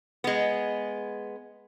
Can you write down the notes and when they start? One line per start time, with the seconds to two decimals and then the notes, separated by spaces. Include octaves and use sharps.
0.24 G#3 B3